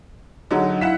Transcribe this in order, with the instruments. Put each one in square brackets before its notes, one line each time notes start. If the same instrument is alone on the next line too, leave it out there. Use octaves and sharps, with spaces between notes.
[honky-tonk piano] D3 F#3 [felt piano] D#4 G#4 F#5
[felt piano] E4 F5 E7 [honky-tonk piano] F#5 B6